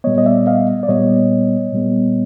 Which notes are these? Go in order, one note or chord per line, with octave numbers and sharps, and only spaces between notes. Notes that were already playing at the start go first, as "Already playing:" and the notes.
A#2 G3 B3 C#5 D#5
D#5
D5 E5
D#5 F5
D5
A#2 G3 B3 C#5 D#5
A#2 G3 B3